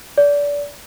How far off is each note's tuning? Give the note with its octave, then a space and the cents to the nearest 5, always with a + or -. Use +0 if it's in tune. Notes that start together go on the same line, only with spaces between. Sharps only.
D5 -25